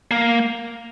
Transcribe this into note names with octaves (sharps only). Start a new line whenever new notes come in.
A#3